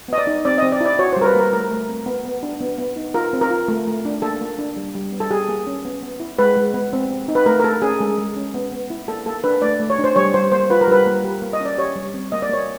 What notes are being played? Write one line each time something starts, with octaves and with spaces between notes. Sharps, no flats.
B3 D#5
D5
D#4
C4 D5
C4 D#5
D5
E4
D5
F#4 C#5
G3 C5
A#4
B4
A#3 A#4
A3 A#4
A3
C4
B3
B3
D4
B3
B3
D#4
F4 A#4
C4
A#4
F4
A3
A3
D4
A#3 A4
A#3
D4
G3
G3
B3
A4
G4 G#4
A#3
C#4
B3
B3
E4
G#3 B4
G#3
B3
C4
C4
D#4
B4
A3 A#4
A#4
A3 A4
C#4 G#4
G#3 A4
G#3
C#4
B3
B3
E4
A#3 A4
A#3 A4
D4 B4
A3 D5
A3
C#5
D4
C5
G3 C#5
G3 C5
A#3 C5
F4 B4
A#4
G3 B4
A#3
G4
A#3
D#5
C#4
D5
G4 C#5
G3
C4
A#3 D#5
D5
A#3 C#5